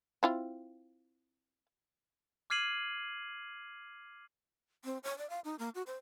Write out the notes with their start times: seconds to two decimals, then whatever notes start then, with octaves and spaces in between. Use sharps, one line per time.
0.23 C4 E4 F4
2.50 D6 F6 G#6 C7 D#7 F#7
4.85 C4
5.04 C#5
5.18 D5
5.30 F5
5.44 D#4
5.59 A#3
5.75 F#4
5.87 C5